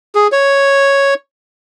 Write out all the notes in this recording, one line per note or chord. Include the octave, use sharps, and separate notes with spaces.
G#4
C#5